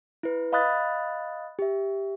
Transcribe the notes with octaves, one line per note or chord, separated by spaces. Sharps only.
E4 B4
D#5 F5 B5 D#6 F#6 A6
G4 E5